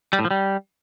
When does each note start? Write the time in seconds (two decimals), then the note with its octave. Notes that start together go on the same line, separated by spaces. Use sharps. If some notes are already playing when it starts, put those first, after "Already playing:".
0.13 G3
0.19 A2
0.25 F3
0.31 G3